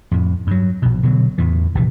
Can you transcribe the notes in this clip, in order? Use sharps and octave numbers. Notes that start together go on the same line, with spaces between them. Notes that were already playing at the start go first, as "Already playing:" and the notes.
F2 A2
G2 F#3
A#1 B2
B2 D3 F#3
E2 A2 E3
A#1 C3 E3